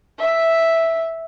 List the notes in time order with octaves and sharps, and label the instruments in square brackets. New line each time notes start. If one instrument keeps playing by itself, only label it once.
[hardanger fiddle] E5